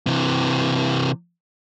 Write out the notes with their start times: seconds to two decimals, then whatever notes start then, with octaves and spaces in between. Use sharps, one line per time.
0.07 C3 E3